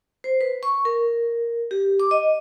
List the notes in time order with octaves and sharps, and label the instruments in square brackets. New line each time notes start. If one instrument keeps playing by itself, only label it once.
[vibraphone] C5
B4
C#6
A#4
G4
D6
D#5